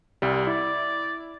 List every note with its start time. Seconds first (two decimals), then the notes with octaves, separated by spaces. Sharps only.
0.22 C2 G3
0.47 E4 D5